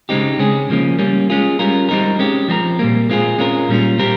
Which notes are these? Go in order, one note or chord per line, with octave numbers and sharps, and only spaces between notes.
C#3 G#3 C4 D#4 G4
C#3 G#3 C#4 G#4
C#3 F3 A#3 C#4
G3 A#3 C#4
G#3 C#4 F4 G#4
G3 C#4 F4 A#4
G3 C4 D#4 A#4
G#3 C#4 G4
F3 C4 G4 A#4
A#2 G3 A#3
G#3 C4 F4 G#4
G#3 C#4 F4 A#4
A#2 G3 C#4 F4
G3 C4 G4 A#4